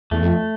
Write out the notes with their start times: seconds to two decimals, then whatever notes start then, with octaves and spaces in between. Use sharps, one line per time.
0.11 E2 A3
0.22 F2